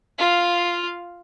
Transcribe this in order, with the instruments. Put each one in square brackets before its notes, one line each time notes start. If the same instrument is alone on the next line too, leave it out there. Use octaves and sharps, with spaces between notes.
[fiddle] F4 F5